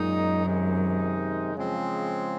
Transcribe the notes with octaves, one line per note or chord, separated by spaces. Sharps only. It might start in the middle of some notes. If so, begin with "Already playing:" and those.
Already playing: F#2 A#2 G#3 D#4
C3 D#3 G#3 D#4
C#3 F3 G#3 C4